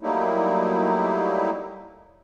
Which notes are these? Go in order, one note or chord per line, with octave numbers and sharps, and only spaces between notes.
F#3 G3 A3 A#3 D#4 E4